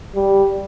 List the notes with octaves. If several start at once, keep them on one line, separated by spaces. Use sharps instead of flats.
G3